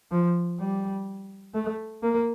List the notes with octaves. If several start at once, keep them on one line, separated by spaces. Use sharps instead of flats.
F3
G3
A3
A#3